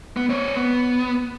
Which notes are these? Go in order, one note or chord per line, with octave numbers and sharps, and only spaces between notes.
B3
C4 C#5
B3